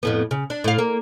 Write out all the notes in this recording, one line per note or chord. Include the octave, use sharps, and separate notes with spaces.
F2 A2 B3
C#3
D4
A2 F5
A#3